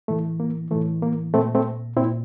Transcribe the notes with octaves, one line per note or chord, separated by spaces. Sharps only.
A2 E3 A3
A#3
A2 E3 A3
A#3
A#2 A3 C4
A3 C4
A#2 C4 E4